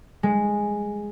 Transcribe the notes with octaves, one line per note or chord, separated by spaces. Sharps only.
G#3